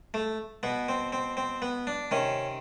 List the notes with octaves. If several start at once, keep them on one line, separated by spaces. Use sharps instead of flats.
A3
B2 B3
C4
C4
C4
B3
D4
C3 D#3 C#4